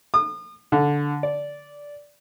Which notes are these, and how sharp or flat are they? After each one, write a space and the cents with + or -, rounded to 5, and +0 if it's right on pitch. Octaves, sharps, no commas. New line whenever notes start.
D#6 -40
D3 -10
D5 -10